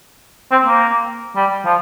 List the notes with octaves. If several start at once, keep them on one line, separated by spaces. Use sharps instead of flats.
C4
A#3
G3
F3